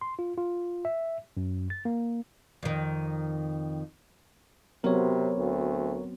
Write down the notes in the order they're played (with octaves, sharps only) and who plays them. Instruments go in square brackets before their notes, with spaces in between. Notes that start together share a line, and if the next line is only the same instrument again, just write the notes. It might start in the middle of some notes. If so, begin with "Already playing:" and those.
[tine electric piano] C6
F4
F4
E5
F#2
A6
A#3
[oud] F2 D#3
[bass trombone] C3 [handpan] F#3 B3 C4 [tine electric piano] A#4 C#5
[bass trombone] D2